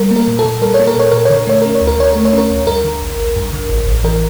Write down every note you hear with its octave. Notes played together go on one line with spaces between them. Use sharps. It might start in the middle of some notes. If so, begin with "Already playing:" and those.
Already playing: G3 A#4
A#3
A#4
A#2
A4
A#2
G3 A#4
C#5
A#3
A#4
A#2 C#5
A#2 A#4
D3 C#5
A#4
A3 C#5
C#4 A#4
C#5
D2
A#4
D3 C#5
A3 A#4
C#5
C#4 A#4
D2
G2 A#4
D3
A1
A1
G2
D3
A1
A1
E3 A#4